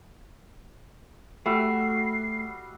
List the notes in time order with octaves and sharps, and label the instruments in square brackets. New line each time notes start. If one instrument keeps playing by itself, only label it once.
[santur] G3 F#4 E5 [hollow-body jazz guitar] A3 [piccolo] C7